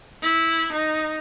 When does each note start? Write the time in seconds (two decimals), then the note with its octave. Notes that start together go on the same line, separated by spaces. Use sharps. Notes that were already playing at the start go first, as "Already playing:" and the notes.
0.22 E4
0.72 D#4